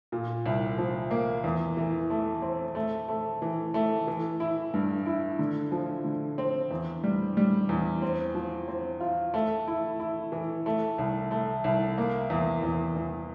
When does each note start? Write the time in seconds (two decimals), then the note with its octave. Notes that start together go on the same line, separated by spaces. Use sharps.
0.12 A#2
0.46 C2
0.78 F3
1.11 A#3
1.44 E2
1.77 E3
2.10 A3
2.42 C4
2.75 A3
3.09 A3
3.42 E3
3.74 A3
4.07 E3
4.40 E4
4.74 G2
5.06 E4
5.39 D3
5.72 F3
6.05 D3
6.38 C4
6.71 E2
7.03 G3
7.37 G3
7.69 E2
8.02 C4
8.35 F3
8.68 C4
9.00 F4
9.34 A3
9.67 E4
10.00 E4
10.32 E3
10.66 A3
10.98 C2
11.31 A3
11.64 C2
11.98 A#3
12.30 E2
12.63 E2
12.96 E2